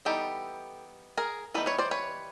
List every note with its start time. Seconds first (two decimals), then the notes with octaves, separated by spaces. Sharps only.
0.05 E3 G3 B3 D#4 G4 A4
1.17 G#4 A#4
1.54 E3 G3 B3 D#4 A4 B4
1.66 B4 C#5
1.78 C5 D5
1.91 B4 C#5